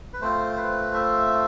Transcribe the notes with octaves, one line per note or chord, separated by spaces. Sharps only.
B4
A3 C4 F4 C5
B4
E5